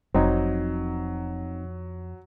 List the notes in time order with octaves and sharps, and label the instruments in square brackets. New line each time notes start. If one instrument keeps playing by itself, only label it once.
[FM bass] F1 [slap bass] F2 [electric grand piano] F#3 [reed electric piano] C4 D#4